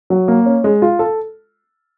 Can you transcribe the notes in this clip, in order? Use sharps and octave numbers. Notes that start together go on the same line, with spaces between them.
F#3
A#3
C#4
G#3
F4
A4